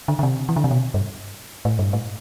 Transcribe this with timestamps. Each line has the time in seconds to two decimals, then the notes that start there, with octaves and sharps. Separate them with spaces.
0.08 D3
0.19 D3
0.23 C3
0.49 E3
0.56 D3
0.64 C3
0.71 B2
0.94 G2
1.65 A2
1.79 G2
1.93 A2